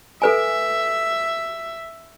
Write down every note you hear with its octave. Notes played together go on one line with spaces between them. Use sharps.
A4 B4 E5 G#5